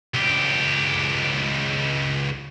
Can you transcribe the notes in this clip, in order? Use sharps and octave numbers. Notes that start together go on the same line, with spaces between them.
C#2 G4